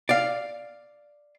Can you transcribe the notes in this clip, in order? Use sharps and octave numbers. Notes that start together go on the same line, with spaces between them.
D5 F5